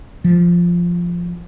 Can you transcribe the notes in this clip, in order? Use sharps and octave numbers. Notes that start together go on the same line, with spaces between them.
F3